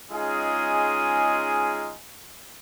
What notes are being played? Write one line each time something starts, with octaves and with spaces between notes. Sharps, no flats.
G#3 C#4 D#4 F4 G#4 D#6